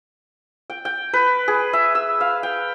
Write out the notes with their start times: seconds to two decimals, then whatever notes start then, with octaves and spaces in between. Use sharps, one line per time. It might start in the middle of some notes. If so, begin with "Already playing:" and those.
0.70 G5
0.85 G5
1.13 B4
1.48 G#4
1.73 E5
1.95 E6
2.21 F5
2.43 G5